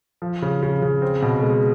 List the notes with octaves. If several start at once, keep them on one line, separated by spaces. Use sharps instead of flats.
F3
C#3
C#3
C#3
C4
B2
G#3